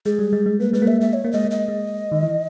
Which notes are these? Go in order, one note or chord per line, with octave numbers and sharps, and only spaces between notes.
G#3 G#4
G3
G#3
G#3
A#3 B4
G#3 B4
A#3
G#3 E5
G#3 E5
C#5
A#3
G#3 D#5
A#3
D#5
G#3
D#3
E3